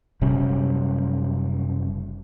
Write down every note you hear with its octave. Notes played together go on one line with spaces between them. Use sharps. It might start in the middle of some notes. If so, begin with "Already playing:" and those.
F#1 C3 G3 C#4